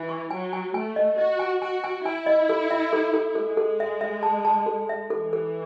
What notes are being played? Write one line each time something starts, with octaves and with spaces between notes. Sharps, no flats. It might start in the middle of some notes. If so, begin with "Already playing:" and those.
Already playing: E3
C#6
F#3 G#5
G#5
A3 G#5
D#5
F#4 D#5
G#5
F#4 G#5
G#5
E4 G#5
D#5
A4
E5
A4
A4
G#3 A4
A4
E5
E5
A5
A5
A4
E5
E3 A4
A4